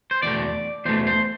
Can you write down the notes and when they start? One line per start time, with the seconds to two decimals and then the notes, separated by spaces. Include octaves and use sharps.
0.11 C5
0.22 E2 B2 A3 D5
0.85 E2 B2 A3 C5
1.07 C5